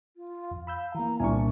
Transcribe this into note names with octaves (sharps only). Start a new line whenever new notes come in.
F4
F2
F5 B5 E6 G6
E3 A#3 A#5
C2 A#2 D4 G#5 C#6